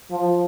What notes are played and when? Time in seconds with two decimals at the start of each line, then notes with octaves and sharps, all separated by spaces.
0.11 F3